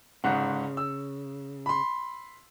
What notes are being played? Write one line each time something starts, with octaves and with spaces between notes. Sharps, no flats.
G1 G#2 C#3 F#5
E6
B5 C6